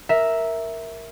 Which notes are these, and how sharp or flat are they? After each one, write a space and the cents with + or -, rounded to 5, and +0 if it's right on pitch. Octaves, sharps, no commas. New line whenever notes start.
A#4 +0 E5 -5